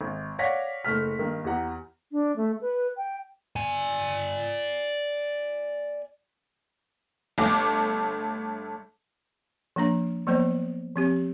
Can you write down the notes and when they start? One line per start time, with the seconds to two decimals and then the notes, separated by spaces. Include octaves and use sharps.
0.01 G#1
0.39 C#5 D5 F5 F#5 A#6 B6
0.85 F#1 A3 F6 B6
1.19 G2 D#3 A#3
1.44 E2 G4 F#5 A#5
2.12 D4
2.36 A3
2.61 B4
2.97 G5
3.56 D5 G#5
7.38 G1 A3 A4 D6
9.76 F3 A#3 D4 A#5
10.27 F3 F#3 A#3 B3 C5 D5
10.96 F3 C4 G4